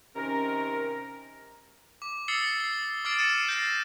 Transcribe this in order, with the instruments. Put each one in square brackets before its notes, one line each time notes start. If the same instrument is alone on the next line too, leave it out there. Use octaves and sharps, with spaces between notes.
[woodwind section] C3 D#3 C#4 A#4
[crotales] D6
D#6 E6 A6 C7 C#7 G7
G7
D6 D#6 F6 A6 C7 D7
D6 A6 C#7 D#7 E7
G6 A#6 C7